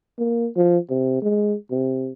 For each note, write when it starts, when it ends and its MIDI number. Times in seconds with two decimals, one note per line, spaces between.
0.18 0.48 58
0.56 0.78 53
0.90 1.21 48
1.22 1.55 56
1.71 2.11 48